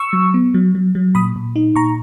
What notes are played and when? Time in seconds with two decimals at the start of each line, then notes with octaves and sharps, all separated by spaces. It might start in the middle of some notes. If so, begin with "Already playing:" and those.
Already playing: C#6 E6
0.13 F#3
0.34 B3
0.54 F#3
0.75 F#3
0.95 F#3
1.15 A#2 B5 D#6
1.36 A#2
1.56 D#4
1.75 A#2 A#5 C#6